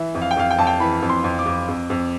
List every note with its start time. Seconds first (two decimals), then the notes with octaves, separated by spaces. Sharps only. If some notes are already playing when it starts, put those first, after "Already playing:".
Already playing: E3 E5
0.15 F2
0.22 F5
0.31 G5
0.37 F2 F5
0.50 G5
0.58 F2 A5
0.67 G5
0.80 E3 B5
1.02 F2
1.09 C6
1.24 F2
1.39 D6
1.46 F2
1.68 F2
1.90 F2